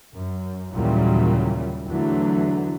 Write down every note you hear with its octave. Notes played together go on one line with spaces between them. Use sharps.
F#2
D#2 A#2 C#3 E3 F#3 G3
E2 D3 E3 F#3 A3